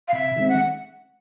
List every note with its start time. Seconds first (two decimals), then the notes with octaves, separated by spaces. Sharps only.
0.08 F5
0.13 C3 E5
0.36 D#3 G#3 C4
0.49 F#5